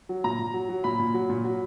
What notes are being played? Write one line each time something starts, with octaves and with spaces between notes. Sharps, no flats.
F#3
A#2 A#5
A#2
F#3
F#3
A#2 B5
A#2
F#3
A#2
F#3